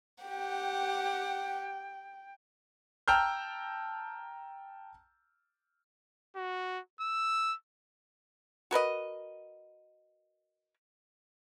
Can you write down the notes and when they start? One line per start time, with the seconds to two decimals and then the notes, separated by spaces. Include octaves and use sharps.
0.24 G4 F#5 G5
3.08 G5 A5 A#5 E6 F6 G6
6.36 F#4
7.01 E6
8.71 F#4 A#4 B4 D#5